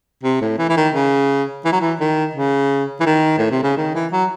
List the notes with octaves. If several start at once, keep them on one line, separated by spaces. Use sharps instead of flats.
C3
A2
E3
E3
D#3
C#3
E3
F#3
E3
D#3
C#3
E3
D#3
A2
C3
C#3
D#3
E3
F#3